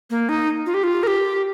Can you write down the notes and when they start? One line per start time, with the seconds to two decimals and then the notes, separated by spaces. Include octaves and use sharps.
0.10 A#3
0.29 D#4
0.66 F4
0.74 G4
0.83 F4
1.03 A#4
1.07 G4